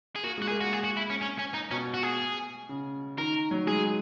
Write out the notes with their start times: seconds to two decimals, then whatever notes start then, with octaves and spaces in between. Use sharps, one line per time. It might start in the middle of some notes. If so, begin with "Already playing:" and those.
0.16 G#4
0.23 A#3 F#4
0.38 G#3 F#4
0.48 G#4
0.51 A#3
0.61 F#4
0.73 G#4
0.84 F#4
0.97 E4
1.09 C#4
1.21 C#4
1.39 C#4
1.54 D#4
1.71 B2 C#4
1.94 F#4
2.03 G#4
2.69 C#3
3.18 D#3 A#4
3.51 F#3
3.67 G#3 G#4